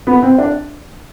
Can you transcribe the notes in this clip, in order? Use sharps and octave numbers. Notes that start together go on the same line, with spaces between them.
B3
C4
D4